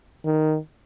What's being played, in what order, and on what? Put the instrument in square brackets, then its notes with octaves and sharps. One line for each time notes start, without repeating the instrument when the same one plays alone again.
[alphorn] D#3